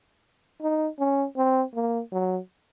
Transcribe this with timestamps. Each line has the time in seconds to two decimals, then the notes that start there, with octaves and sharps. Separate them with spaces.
0.62 D#4
0.99 C#4
1.37 C4
1.75 A#3
2.12 F#3